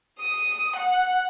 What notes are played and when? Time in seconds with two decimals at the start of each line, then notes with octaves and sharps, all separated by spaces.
0.20 D#6
0.76 F#5